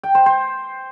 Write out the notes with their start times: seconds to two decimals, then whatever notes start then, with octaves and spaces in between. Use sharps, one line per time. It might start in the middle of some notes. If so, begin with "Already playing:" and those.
0.03 G5
0.15 C5
0.26 C5